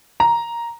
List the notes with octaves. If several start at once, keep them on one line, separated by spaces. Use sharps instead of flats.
A#5